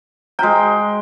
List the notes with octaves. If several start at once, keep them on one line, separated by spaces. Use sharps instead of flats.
G#3 F#4 C5 G5 A#5